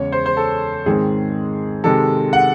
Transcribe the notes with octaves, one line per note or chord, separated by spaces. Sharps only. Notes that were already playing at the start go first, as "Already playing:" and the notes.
Already playing: E2 C#3 G#3 C#5
C5
C5
A4
G#2 D#3 G#3 C4 G#4
C3 D#3 G#3 C4 A4
F#5